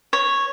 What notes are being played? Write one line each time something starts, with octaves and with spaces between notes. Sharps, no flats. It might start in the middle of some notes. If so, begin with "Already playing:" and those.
C#5